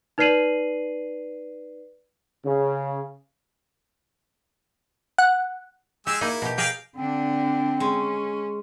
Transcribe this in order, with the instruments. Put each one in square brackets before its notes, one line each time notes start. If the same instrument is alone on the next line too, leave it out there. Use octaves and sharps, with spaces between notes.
[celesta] D#4 B4 D5 C7 D#7 F#7
[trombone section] C#3
[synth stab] F#5
[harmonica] G#3 G#5 E6 [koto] G4
[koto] A#3 D#4 G#4 [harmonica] E4
[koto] B2 G4
[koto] G4 G#4 A#4 [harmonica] F5 G5
[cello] D3 D4 [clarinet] C4
[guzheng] G#3 [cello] C#4